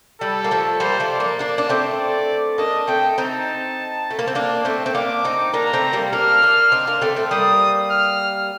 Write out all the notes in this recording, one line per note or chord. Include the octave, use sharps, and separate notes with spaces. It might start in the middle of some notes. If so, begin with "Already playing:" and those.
G3 A4
A#3
F3 A3
G3 A#3 C5
F3 A3
D5
A#3 D4
A#3 D4 D5
D4
A3 C4 C5
D5
A#3 D4 D#5
A3 C4 G5
C4 D#4 A5
A3
A#3
C4
A#3 D4
A3 C4
C4
A#3 D4 D6
C4 D#4
A#3 D4 A#5
A3 C4
G3 A#3
A#3 D4 F6
A#3 D4
C4 D#4
A#3 D4
A3 C4
A3 C4
G3 A#3 D#6
F6